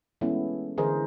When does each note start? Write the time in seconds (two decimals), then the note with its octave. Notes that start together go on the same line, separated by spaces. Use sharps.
0.21 E3 G#3 A3 B3 C#4 E4
0.77 D3 E3 G#4 A#4 C5 D#5